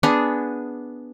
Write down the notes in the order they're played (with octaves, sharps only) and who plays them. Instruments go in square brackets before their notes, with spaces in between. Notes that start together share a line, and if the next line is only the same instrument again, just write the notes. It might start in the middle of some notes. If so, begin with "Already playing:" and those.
[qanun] B3 D4 G#4